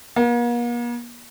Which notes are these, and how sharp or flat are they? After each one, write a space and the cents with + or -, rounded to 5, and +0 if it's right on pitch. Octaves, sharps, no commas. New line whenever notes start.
A#3 +45